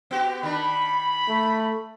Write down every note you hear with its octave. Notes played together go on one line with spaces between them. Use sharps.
B3 F#4 G4
D#3 D4 B5
A3